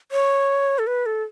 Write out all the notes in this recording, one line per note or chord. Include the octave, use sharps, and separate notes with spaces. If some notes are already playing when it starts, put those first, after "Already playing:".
C#5
A4
B4
A4